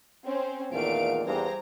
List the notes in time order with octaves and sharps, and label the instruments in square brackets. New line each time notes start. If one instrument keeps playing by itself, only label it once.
[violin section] C4 C#4 C5
[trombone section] E2 A#2 D#3 [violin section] A3 F5 D7
[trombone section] E2 G2 [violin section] G#4 C5 A#5